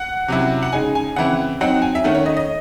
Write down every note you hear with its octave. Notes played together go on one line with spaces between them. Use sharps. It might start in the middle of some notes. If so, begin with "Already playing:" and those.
Already playing: F#5
C3 F#3 C#4 E4
F#5
C#3 G#3 D#4 G#5
G#5
C#3 E3 C4 E4 F#5
F#3 C4 D#4 F#5
G#5
E5
D#3 A3 C#4 F#5
C#5
D#5
D#5